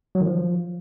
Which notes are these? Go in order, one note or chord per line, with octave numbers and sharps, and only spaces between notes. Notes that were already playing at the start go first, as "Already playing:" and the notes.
F#3
D#3
F3